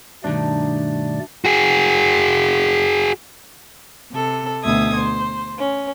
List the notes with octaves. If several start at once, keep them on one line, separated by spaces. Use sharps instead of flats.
G2 B2 D#3 A3 D4 D5
F#4 G#4
C3 A4
D2 B2 E5 D#6 G#6
C5
C#4